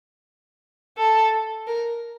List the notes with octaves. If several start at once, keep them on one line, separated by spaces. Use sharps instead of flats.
A4
A#4